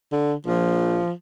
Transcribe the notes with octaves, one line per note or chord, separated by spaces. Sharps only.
D3
A#1 F3